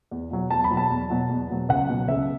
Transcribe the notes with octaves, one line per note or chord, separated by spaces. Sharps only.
E2
B2 F#3
E2 A5
B5
B2 F#3
A5
E2
B2 F#3
E2
B2 F#3
C#2 F#5
B2 F#3
C#2 E5